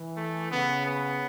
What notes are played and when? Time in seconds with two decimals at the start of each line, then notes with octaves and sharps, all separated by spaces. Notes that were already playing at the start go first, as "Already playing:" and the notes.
Already playing: E3
0.16 A3
0.50 C#3 B3
0.86 B3